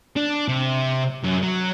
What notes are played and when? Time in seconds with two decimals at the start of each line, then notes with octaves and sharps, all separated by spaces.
0.16 D4
0.48 C3
1.23 F#2
1.42 F#3